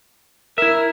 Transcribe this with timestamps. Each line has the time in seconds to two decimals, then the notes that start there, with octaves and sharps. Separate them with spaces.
0.58 E4 A#4 E5